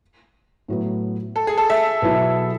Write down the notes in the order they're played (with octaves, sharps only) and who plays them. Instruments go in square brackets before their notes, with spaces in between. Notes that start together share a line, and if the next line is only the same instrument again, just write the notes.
[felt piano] A2 F#3 B3
[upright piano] A4
G#4
A4
E5
[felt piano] B2 F#3 B3 E4